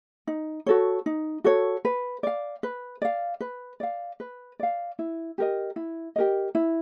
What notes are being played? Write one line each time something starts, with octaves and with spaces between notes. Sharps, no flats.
D#4
F#4 A4 C#5
D#4
F#4 A4 C#5
B4
D5 F5
B4
D5 F5
B4
D5 F5
B4
D5 F5
E4
G4 A#4 D#5
E4
G4 A#4 D#5
E4